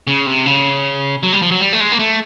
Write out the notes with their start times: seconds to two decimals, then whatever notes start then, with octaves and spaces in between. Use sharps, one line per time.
0.07 C#3
0.26 C3
0.46 C#3
1.23 F#3
1.33 G3
1.42 F3
1.52 F#3
1.60 G3
1.73 A3
1.80 G#3
1.92 A#3
1.99 A3